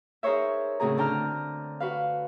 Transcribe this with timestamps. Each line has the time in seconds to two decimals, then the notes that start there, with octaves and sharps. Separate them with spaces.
0.23 D#4 G#4 A#4 C5 C#5 E5
0.80 A2 C#3 C4 F#4 G#4 A#5
0.97 D3 D4 G5 A#5 F6
1.80 F#4 B4 F5